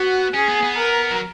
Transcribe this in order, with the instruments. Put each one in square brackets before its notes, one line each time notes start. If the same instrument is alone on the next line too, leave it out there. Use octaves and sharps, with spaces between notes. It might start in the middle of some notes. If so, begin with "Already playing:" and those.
Already playing: [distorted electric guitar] B3 [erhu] F#4
[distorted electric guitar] C#4 [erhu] G#4
[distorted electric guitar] B3
B3
[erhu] A#4
[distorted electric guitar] F#3